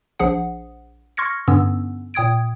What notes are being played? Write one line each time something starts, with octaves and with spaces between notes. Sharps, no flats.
A#1 F3 G#4 F#5
C6 C#6 F6 G#6 A#6 C#7
G2 D3 B3 C#4 E6
A#2 G5 D#6 G#6 D7